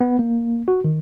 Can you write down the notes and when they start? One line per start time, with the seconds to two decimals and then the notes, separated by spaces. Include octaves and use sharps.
0.01 B3
0.19 A#3
0.68 F#4
0.84 D#3